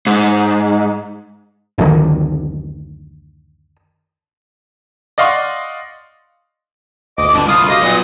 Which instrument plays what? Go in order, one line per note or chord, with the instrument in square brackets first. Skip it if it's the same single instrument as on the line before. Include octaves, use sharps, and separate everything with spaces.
[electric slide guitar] G#2
[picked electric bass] F#1 D2 D3 D#3
[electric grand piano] D5 D#5 F5 F#5 C6 C#6
[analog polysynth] G1 D2 [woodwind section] D#5 D6
[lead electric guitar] G2 [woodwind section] G#3 C4 D4
[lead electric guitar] C2 [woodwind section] F4 D#6 [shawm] F5
[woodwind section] F#4 G4 F5 [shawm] D#5
[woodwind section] A#2 [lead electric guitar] F#3 B3